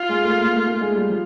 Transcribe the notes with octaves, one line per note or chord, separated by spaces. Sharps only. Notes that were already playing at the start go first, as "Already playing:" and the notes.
Already playing: F4
G#3
A3
A#3
A3
A3
G#3
G3
F3